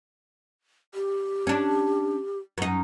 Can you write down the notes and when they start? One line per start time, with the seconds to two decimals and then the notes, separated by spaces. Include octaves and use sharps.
0.95 G4
1.47 C#4 D4
2.58 F#2 D#4